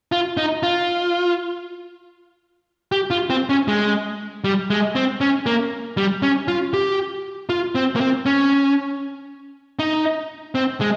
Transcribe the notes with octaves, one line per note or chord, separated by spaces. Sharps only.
F4
D#4
F4
G4
F4
C4
C#4
G#3
G3
G#3
C4
C#4
A#3
G3
C#4
F4
G4
F4
C4
A#3
C4
C#4
D#4
C4
G#3